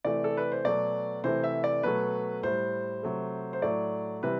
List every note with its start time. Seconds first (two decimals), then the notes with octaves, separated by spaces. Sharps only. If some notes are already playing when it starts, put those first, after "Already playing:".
0.05 C3 E3 A3 D5
0.24 A4
0.37 B4
0.52 C5
0.65 B2 F#3 A3 D5
1.24 C3 E3 A3 C5
1.44 E5
1.64 D5
1.83 B2 F#3 A3 B4
2.43 A2 G3 C5
3.03 C3 F#3 A3
3.53 C5
3.62 A2 F#3 A3 D5
4.23 C3 E3 G3 B4